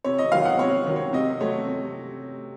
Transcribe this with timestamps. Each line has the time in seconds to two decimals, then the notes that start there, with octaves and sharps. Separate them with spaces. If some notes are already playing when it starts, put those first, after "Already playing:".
0.04 C3 C#5
0.18 D#5
0.32 D#3 F#3 F5
0.45 F#5
0.59 C3 C#5
0.86 D#3 F#3
0.96 C#5
1.13 C3 D#5
1.41 F#3 A3 C#5
1.67 C3